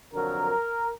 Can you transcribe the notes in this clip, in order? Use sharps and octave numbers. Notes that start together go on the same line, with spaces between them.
F2 D3 F#3 A#4